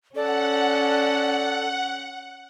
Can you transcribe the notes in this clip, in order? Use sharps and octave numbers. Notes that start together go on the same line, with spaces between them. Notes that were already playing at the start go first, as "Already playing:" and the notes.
C#4 A4 D5 F#5